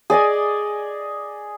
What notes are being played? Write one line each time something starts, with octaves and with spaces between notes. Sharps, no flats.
G#4 D5 D#5 G#5